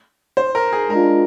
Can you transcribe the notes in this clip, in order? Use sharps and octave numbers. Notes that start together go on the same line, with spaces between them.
C5
A#4
G#4
G#3 D4 F4 A#4